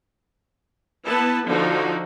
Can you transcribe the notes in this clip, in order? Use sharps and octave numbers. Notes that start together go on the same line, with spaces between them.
B3 E4 B4 A5
D3 F3 D#4 F#4